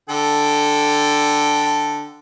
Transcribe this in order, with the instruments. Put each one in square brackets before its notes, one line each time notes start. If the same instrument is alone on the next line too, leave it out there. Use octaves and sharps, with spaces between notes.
[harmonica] D3 A4 G5